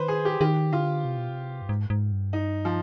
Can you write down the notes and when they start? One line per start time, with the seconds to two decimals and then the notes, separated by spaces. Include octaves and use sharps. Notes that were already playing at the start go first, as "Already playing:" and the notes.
Already playing: D#3 B4 C5
0.08 G#4
0.25 G4
0.41 D#3 G4
0.73 D3 F4
1.05 C3
1.17 B2
1.29 C3
1.62 G2
1.69 G#2
1.90 G#2
2.12 G2
2.33 D#4
2.65 F3